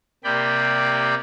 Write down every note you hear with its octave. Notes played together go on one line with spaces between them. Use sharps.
C3 A#3 G4 D5 G5 B5